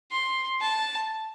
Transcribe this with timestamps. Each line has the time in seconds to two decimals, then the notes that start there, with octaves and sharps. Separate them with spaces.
0.11 C6
0.61 A5